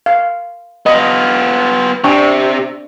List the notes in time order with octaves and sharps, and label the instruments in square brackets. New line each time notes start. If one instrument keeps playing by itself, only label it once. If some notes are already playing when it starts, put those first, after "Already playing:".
[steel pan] F5
[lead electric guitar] B3 F4 [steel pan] D#5
[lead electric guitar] C3 [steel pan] D4 G5 C#6